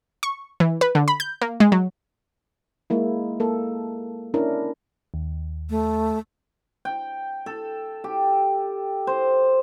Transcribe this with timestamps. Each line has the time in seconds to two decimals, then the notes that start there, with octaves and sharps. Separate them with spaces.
0.23 C#6
0.60 E3
0.81 B4
0.95 D3
1.08 B5
1.20 G6
1.42 A#3
1.60 G#3
1.72 F#3
2.90 G#3 A#3 E4
3.40 A#3 A4
4.34 C#4 D4 E4 A#4
5.14 D#2
5.70 A3
6.85 G5
7.46 A4
8.04 G4
9.07 C5